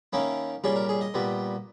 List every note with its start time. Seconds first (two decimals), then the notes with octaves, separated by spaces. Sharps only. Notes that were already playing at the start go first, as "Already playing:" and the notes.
0.13 D#3 A#3 C#4 E4
0.64 A#2 G3 C#4 G#4
0.76 A#4
0.89 G#4
1.01 D#5
1.14 A#2 G3 B3